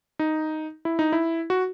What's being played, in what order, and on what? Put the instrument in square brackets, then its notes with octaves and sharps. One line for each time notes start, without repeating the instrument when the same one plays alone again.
[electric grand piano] D#4
E4
D#4
E4
F#4